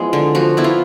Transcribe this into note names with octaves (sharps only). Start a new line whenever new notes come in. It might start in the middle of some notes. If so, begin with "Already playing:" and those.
Already playing: F3 G#3 B3 E4
D3
F3 F#4
B3 E4
F4